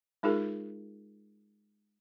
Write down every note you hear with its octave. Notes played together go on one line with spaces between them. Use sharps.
G#3 D#4 F4 G#4 A#4